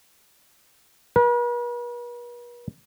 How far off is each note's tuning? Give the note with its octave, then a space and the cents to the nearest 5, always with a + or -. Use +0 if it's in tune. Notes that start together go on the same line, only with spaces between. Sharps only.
B4 -45